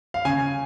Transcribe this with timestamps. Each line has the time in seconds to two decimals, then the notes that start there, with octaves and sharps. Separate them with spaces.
0.14 F5
0.25 C#3 G#5